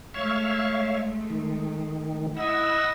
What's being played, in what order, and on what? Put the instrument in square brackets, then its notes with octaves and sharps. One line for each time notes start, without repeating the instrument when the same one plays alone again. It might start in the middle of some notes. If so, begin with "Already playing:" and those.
[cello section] G#3 A3 [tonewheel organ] C#5 E5 F5
[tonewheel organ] D#3
[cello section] E4 [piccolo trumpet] D#5 [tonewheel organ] F#5 E6